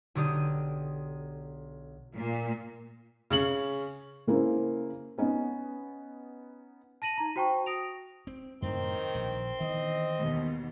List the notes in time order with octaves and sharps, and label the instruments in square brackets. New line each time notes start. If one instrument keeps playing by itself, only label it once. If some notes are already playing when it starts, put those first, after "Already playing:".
[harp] B1 D3 G4 D#6 D#7
[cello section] A#2
[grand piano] C#3 C#4 F#7
[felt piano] C#3 A#3 C#4 E4 C5
B3 C#4 D#4
[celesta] A5 A#6 D#7 F#7
D#4 A#5
F#4 C5 G5 A5 C#6
D#6 A#6 D7 F7
[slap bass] C4
[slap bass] F#2 A2 C3 [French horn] D#3 [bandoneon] C4 C6
[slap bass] A#1
[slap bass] D#3 E3 B3 [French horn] D#5
[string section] D#2 B2